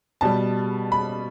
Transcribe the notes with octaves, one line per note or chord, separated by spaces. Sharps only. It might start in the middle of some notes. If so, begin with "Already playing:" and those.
B2 G3 A5
B5